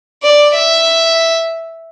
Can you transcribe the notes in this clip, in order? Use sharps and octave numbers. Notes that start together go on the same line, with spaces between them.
D5
E5